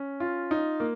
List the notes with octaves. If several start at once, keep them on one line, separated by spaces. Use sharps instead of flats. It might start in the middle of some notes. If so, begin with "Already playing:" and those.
Already playing: C#4
F4
D#4
A#3